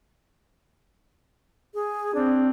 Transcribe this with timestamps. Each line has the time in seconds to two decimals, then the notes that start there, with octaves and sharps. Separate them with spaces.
1.74 G#4
2.15 C4 D4